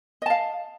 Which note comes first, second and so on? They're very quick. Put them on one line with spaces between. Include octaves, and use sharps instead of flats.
D#5 A5 F5